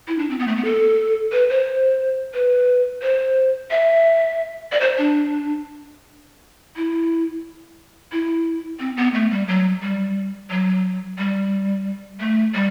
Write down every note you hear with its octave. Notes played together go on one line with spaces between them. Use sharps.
E4
D4
C4
B3
A3
B3
A4
B4
C5
B4
C5
E5
D5
C5
D4
E4
E4
C4
B3
A3
G3
F#3
G3
F#3
G3
A3
G3